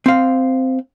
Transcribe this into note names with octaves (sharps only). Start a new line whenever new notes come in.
C4 F5